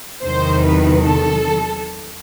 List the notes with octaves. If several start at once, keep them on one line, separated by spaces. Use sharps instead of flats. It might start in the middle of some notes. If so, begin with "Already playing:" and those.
E2 C3 D#3 F#3 C5
B4
A4